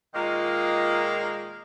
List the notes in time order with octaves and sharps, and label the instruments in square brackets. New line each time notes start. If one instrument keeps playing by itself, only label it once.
[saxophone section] A#2 D#3 G#3 A#3 F4 D#5